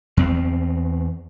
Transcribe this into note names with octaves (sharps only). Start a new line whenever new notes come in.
E2 C4